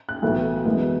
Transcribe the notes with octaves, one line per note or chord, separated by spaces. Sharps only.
F#6
B1 A2 E3 B3
F#2 E3 G#3 B3